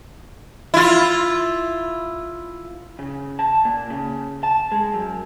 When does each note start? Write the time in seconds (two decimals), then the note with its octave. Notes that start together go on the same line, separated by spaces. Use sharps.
0.74 E4 F4
2.99 C#3
3.39 A5
3.65 A#2
3.90 C#3
4.43 A5
4.72 G#3
4.94 F#2